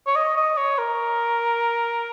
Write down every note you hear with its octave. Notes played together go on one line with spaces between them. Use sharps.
C#5
D#5
D#5
C#5
A#4